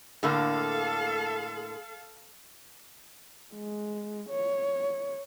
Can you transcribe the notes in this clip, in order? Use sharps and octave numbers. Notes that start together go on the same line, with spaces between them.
A2 D3 A#3 A4 F5
G#3
C#5